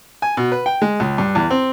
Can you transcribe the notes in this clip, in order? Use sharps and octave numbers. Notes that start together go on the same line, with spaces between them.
G#5
B2
B4
G5
G#3
C#2
G2
E2
C4